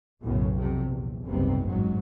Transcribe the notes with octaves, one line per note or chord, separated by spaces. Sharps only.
B1 F#2 A2 C#3
F2 C3 F#3
A#1 E2
F#1 C2 G#2 C3 B3 C4
A1 G#2 F#3 G#3